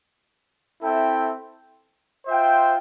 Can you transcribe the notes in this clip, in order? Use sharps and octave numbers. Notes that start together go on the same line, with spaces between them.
C4 E4 A4 E5 G5
F4 C5 E5 G5